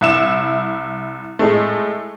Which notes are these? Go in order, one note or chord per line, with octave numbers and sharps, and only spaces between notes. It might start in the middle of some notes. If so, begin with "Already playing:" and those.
C2 E4 E7
A2 G#3 A3